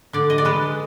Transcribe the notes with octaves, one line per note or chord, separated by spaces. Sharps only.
D3 D5
D#5
D5
G#3 B4